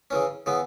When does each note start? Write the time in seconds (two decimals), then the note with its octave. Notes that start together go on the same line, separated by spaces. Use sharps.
0.10 C#3 E3 C#4
0.46 C#3 E3 B3